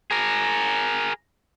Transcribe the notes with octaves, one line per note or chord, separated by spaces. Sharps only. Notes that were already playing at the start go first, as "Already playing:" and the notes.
G#4 A#4